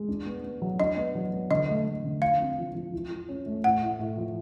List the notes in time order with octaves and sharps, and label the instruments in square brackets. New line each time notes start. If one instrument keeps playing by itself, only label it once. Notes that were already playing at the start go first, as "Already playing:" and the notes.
Already playing: [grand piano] G#3
D4
B3
B3
F#3
[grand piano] D4 [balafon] D#5
[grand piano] B3
F#3
B3
[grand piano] D3 [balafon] D#5
[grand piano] A3
A3
D3
[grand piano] F3 [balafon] F5
[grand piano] C4
F3
F3
E4
E4
C#4
A3
[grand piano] A2 [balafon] F#5
[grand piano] A2
A2
F3